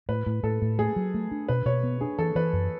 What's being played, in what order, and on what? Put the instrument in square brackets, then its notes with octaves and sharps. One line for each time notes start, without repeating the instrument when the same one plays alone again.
[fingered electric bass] A2 [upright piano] B4
[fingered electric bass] A2
[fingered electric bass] A2 [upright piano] A4
[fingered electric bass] A2
[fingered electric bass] A3 [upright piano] G#4
[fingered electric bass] F#3
A3
D4
[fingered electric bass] B2 [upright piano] B4
[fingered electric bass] B2 [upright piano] C#5
[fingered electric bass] B3
[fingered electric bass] D4 [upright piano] G#4
[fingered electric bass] E3 [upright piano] A4
[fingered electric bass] E3 [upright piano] B4
[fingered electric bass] F#2